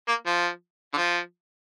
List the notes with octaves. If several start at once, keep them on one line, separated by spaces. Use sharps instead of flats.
A#3
F3
D3
F3